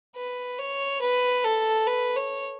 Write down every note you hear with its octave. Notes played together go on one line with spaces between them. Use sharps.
B4
C#5
B4
A4
B4
C#5